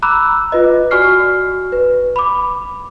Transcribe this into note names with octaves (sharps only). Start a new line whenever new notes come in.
A#5 B5 D6 E6 F#6
F4 B4 D#5
F#4 D5 G#5 C#6 F6 C7
B4
B5 D6